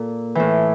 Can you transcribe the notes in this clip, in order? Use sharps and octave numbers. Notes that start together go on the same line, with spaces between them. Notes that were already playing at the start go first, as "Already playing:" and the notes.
Already playing: A#2 A4
A2 E3